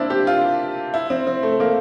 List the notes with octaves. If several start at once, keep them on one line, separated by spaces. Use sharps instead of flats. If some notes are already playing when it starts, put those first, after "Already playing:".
Already playing: A#3 C4 D4 E4
G4
F4
E4
C4
C4
A3
A#3